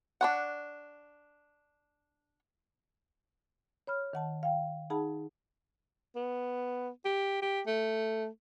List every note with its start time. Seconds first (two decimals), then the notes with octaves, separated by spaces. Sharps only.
0.21 D4 C#5 F#5
3.87 C#5 B5 F6
4.13 D#3 F#5 A5
4.43 F5 G5
4.90 D#4 G#4 F#5 A5 B5
6.16 B3
7.05 G4
7.42 G4
7.67 A3